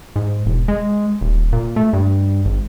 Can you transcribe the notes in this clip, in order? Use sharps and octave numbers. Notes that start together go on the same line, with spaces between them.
G#2
E1
G#3
D#1
A#2
A3
G2
G#1